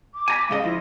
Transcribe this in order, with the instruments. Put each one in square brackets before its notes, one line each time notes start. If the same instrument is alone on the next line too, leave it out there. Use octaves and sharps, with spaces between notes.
[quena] D6
[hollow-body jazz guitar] G#5 A#5 B5
[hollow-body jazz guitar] G#2 C#3 D#5 [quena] F5
[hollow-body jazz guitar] F3 [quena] E4